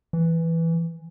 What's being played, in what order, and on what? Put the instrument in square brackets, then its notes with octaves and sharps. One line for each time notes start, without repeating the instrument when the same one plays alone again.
[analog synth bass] E3